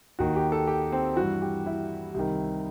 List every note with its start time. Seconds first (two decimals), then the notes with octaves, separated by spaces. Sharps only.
0.19 D#2 D#3 F#4
0.36 G4
0.52 A4
0.67 G4
0.92 C4
1.16 G2 E3 F#4
1.42 G4
1.66 E4
2.14 C2 C3 D#3